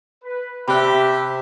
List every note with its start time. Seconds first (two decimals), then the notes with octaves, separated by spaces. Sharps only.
0.24 B4
0.68 C3 G4 E5 B5 F#6